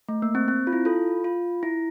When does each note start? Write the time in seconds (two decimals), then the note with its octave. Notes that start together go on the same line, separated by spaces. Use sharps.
0.09 A3
0.22 A#3
0.35 C4
0.48 C4
0.67 F4
0.73 E4
0.85 F4 A4
1.24 F4
1.63 E4